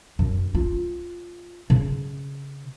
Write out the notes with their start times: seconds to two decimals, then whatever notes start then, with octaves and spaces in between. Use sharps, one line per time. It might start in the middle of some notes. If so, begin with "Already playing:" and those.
0.19 F#2
0.55 F4
1.70 C#3